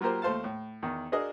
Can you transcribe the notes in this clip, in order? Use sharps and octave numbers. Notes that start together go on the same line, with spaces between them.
F#3 A#3 F4 G4 A#4 C5
D#2 A3 C5 F5 A5
A2
E2 D#3
D4 F#4 G#4 A#4 D#5